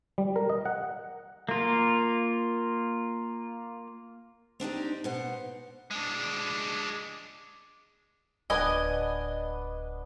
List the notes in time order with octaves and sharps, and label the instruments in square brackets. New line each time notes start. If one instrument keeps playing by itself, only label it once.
[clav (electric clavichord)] G3
A#4
D#5
F#5
[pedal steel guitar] A#3 F4
[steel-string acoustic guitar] C4 D4 D#4 G4
B2 C5 F#5
[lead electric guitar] G#3 D4
[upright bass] D1 F4 [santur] B3 D4 D6 [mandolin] D#5 G#5